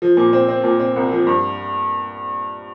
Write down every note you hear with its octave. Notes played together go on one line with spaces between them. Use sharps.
F3
A#2
C4
C4
A#2
C4
C2
F3
G2